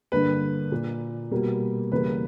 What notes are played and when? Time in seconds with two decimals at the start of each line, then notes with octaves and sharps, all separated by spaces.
0.12 G2 D3 A#3 B4
0.72 A#2 A#3
1.31 B2 G3 A#3
1.92 E2 C#3 G3 A#3 B4